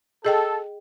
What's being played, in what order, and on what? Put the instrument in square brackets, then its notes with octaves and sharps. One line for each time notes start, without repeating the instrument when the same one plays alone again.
[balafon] G#4 D#5 G5 [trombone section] A4